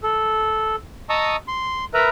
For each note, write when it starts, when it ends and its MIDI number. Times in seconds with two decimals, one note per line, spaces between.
0.03 0.76 69
1.10 1.36 75
1.10 1.36 81
1.10 1.36 82
1.10 1.36 85
1.10 1.36 87
1.10 1.36 88
1.48 1.85 84
1.94 2.09 70
1.94 2.09 71
1.94 2.09 76
1.94 2.09 82
1.94 2.09 83